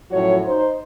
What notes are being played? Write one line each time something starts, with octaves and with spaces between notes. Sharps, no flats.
F#2 A2 F3 F#4 C#5
D#4 C5